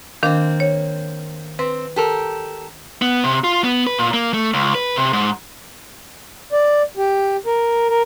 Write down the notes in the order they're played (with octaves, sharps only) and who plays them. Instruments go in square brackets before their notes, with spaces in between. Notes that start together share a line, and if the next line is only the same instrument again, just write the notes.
[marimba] D#3 D4 [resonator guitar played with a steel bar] A#3 C4
[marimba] C#5
[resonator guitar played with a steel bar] C4 [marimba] B4
[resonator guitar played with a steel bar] G4 A4 A#4
[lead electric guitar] B3
C3
F4
B3
B4
A#2
A#3
A3
C#2
B4
C3
G#2
[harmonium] D5
G4
A#4
A#4